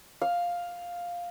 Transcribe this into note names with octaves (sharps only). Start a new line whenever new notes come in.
F5